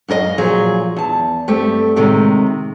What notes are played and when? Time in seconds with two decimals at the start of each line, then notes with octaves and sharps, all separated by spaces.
0.08 F#2 E4 A#4 D#5 F5
0.38 A#2 F3 F#3 G#4
0.96 E2 A5
1.48 G2 A3 C4 G4
1.96 A2 C3 D#3 G#3